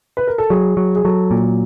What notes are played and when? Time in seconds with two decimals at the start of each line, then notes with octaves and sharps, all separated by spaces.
0.17 B4
0.27 A#4
0.38 A4
0.50 F#3 G#4
0.77 F#3
0.96 G#4
1.04 F#3 A4
1.31 A#2